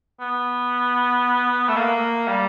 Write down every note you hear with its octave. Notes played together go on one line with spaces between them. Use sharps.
B3
A3
A#3
G3